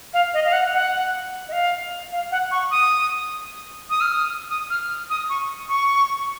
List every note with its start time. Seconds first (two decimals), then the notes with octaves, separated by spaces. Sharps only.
0.14 F5
0.34 D#5
0.45 F5
0.53 F#5
0.73 F#5
1.49 D#5
1.52 F5
2.12 F5
2.31 F#5
2.51 C#6
2.71 D#6
3.90 D#6
4.01 F6
4.12 D#6
4.50 D#6
4.70 F6
5.10 D#6
5.29 C#6
5.69 C#6